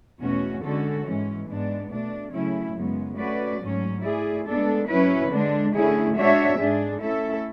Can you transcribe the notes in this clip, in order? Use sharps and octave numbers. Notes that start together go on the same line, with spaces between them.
E2 B2 A3 C#4 F#4
D3 G#3 C#4 F#4 A4
G#2 E3 G#3 C#4
G#2 G#3 B3 D4
B2 A3 D4
C#3 F#3 A3 C#4 E4
F#2 C#3 G#3 B3
A3 C#4 F#4 B4 D5
G#2 F#3 A3 C#4
A3 E4 G#4 D5
G#3 B3 D4 A4
F#3 C#4 E4 B4
D3 G#3 D4
D3 A3 C#4 E4 G#4
G#3 D4 F#4 C#5 E5
G#2 G#3 D4 G#4
A3 C#4 E4 A4 E5